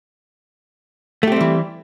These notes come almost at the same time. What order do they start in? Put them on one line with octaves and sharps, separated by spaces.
A3 G4 C4 G3 E3